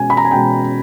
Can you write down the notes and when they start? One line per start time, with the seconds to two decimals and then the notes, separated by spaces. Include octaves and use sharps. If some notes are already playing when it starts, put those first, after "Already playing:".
Already playing: B2 G#3 C#4 G#5
0.10 B5
0.17 A#5
0.24 G#5
0.31 B2 G#3 C#4 G5